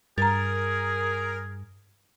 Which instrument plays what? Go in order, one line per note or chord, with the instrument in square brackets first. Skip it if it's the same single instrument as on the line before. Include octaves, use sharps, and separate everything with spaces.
[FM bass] G2 [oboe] G#4 [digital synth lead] A#4 [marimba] A#5 A6